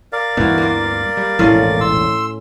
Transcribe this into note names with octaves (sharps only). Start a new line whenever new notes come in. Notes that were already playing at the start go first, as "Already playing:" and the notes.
A#4 D5 F5
D2 G2 E3 B3 F#4
A#3 F4
G3
E1 A#1 A2 F3 C#4 F4
C6 E6